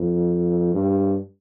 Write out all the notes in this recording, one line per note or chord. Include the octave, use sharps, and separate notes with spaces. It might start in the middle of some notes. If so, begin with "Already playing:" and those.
Already playing: F2
G2